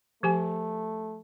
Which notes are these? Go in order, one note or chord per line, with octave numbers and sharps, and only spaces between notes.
F3 A3 G4 G#5